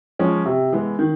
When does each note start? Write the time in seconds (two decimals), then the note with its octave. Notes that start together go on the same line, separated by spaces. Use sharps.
0.19 F3 G#3 C#4
0.46 C3
0.72 E3 G#3 B3
0.99 D#3